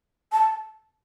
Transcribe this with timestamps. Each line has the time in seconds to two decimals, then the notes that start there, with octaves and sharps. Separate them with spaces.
0.32 A5